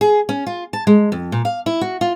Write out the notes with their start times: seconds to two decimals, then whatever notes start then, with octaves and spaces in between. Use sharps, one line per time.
0.01 G#4
0.29 C#4
0.46 F4
0.73 A5
0.87 G#3
1.12 F2
1.32 A#2
1.45 F5
1.66 E4
1.81 F#4
2.01 F4